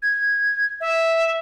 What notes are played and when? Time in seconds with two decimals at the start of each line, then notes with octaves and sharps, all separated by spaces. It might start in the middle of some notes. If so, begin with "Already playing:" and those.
0.02 G#6
0.81 E5